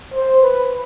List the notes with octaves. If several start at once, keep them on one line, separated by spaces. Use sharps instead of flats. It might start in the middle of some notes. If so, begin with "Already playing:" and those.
C5
B4